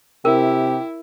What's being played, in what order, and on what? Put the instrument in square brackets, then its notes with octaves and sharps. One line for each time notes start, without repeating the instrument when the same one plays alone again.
[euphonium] C3 [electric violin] E4 [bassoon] G4 [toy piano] A#4